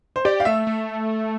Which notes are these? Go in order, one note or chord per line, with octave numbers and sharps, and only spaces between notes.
C5
G4 D5
F5
A3 E5
A3